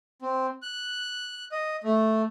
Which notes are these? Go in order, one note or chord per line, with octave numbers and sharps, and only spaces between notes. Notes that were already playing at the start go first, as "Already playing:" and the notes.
C4
F#6
D#5
A3